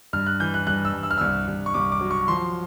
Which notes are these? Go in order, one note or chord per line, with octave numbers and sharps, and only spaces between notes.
G2 F6
F#6
E3 G6
F#6
G2 F#6
E6
G2
E6
F6
C2 E6
C2
C#6
C2 D6
D6
F#3
C#6
F3 C6